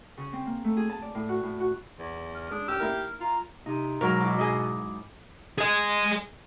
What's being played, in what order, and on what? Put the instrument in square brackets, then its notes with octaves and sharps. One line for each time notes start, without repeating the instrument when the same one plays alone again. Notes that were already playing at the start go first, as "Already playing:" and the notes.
[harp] C#3
C4
A#3
A3
G#4
A5
D5
A2
F#4
A2
F#4
[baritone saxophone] E2
[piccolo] F6
[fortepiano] G#3 [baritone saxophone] D4 [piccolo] D#6
[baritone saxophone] G4 [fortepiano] E6 [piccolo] F6
[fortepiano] A#3 E4 A#4
[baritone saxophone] F4 [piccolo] A#5
[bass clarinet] C3 [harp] D#4
[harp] G#2 F#3 [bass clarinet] B2 [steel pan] A#4
[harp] E4 D6
[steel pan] G#4 D#5
[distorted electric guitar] G#4 D#5